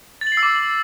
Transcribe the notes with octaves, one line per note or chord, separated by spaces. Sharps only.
A6
F#7
C7
E6
D6